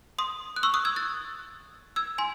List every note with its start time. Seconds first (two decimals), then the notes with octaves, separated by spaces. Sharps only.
0.18 C6 D#6
0.56 F#6
0.63 C#6 E6
0.74 D#6 F#6
0.85 E6 G#6
0.96 F#6 A6
1.96 E6 G#6
2.18 G#5 C6